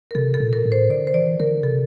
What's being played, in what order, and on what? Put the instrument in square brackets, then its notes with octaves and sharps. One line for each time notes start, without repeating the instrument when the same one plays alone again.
[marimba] A#4
[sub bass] C3 [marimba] A4
[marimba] A4
[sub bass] A#2
[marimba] A#4
[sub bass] A2
[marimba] C5
[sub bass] D3 [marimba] D5
[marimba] C5
[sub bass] E3 [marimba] D5
[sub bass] D3 [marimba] A#4
[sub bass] C3 [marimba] A4